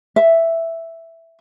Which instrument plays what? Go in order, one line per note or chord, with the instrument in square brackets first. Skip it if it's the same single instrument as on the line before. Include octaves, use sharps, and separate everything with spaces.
[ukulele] E5